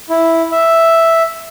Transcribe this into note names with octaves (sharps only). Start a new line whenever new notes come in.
E4
E5